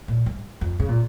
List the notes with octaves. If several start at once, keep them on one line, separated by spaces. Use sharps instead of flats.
A#2
G2
F2
C#3
A#2